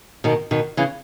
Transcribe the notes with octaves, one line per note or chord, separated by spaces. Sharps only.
B2 D#3
B2 D#3
C#3 E3